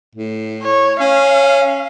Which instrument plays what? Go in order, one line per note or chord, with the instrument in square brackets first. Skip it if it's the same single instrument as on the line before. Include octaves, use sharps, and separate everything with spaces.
[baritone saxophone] A2
[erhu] C#5
[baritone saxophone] C#4 [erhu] F5